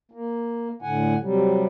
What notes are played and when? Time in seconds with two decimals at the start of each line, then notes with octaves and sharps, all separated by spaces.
0.12 A#3
0.82 A2 D3 F#5 G#5
1.20 C3 F#3 G3